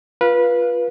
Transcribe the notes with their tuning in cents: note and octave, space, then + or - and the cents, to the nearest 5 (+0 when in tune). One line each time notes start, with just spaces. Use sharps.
F4 +0 B4 -20 F5 +0